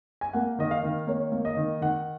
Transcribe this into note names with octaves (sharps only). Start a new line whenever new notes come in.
G#5
A#3 F#5
D#3 D#5
F5
D#3
A#3 C#5
A#3
D#5
D#3
D#3 F#5